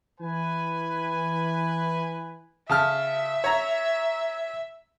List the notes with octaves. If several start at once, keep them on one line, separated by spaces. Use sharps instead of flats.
E3 B4 G#5
C#3 E5 A5 F6
C#5 A#5